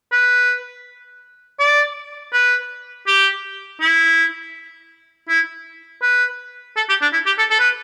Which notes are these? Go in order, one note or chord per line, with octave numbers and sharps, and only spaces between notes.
B4
D5
B4
G4
E4
E4
B4
A4
G4
D4
E4
G4
A4
A4
B4